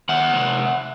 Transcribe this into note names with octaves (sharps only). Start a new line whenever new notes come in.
D#3 E5 F#5
C3